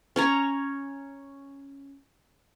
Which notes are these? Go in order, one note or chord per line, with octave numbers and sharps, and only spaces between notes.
C#4 C#5 A#5